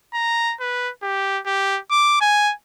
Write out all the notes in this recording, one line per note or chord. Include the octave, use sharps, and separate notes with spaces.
A#5
B4
G4
G4
D6
G#5